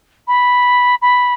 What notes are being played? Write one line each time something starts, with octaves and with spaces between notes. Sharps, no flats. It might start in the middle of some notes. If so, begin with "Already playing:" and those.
B5
B5